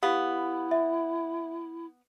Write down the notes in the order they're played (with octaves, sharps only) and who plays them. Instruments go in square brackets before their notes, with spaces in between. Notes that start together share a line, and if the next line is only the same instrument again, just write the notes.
[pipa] B3 [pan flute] E4 [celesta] G4 F5
[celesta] E5